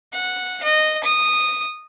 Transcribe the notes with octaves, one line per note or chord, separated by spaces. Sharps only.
F#5
D#5
D#6